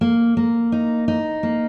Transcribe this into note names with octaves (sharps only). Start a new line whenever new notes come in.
A#3
A#3
D#4
D#4
A#3